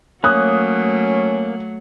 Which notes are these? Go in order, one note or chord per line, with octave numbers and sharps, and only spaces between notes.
F#3 A3 A#3 C#4 D#6 F#6